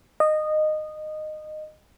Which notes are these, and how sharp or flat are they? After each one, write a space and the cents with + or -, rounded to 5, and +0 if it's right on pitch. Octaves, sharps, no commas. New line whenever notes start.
D#5 -15